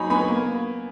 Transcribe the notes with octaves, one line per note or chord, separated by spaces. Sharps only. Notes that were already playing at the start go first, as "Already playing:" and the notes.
Already playing: F#3 A#3 D#4 G#5 A#5 B5 C#6
B3 G#5 B5
A#3